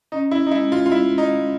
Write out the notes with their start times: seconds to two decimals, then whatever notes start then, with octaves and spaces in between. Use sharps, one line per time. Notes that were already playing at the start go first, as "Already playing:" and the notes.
0.12 C#4 D#4
0.31 E4
0.47 D#4
0.51 G#3 E4
0.72 F4
0.86 F4
0.92 G#3 E4
1.18 D#4
1.31 G#3